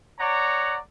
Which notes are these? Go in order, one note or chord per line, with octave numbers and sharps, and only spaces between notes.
C#5 D5 F#5 A#5